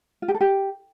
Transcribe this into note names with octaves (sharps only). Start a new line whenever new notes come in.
F4
G4
A4
G4